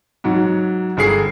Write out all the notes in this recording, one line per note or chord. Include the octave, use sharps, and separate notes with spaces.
G#2 F#3
G1 G#4 C7